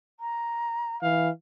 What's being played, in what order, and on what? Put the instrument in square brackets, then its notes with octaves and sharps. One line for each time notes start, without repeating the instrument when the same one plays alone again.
[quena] A#5
[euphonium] E3 [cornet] F5